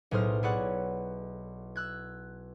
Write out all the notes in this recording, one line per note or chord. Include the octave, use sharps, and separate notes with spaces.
B1 A2 G#4 C5 D#6 F6
E4 G#4 C#5 D5 F#5
E6 F#6 G#6